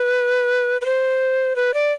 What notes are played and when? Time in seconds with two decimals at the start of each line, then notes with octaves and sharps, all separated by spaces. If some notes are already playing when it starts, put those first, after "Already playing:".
Already playing: B4
0.81 B4
0.86 C5
1.56 B4
1.74 D5